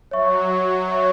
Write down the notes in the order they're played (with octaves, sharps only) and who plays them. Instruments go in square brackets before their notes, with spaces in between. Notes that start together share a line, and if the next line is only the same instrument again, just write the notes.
[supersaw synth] F#3 [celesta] C#5 E5 C#6
[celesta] C#5 E5 C#6